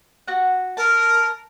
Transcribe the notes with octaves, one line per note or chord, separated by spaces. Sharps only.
F#4 F#5
A#4 A5